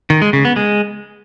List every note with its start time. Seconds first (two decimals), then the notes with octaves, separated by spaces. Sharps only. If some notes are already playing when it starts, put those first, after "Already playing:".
0.10 D#3
0.22 G#3
0.33 C#3
0.45 B3
0.56 G#3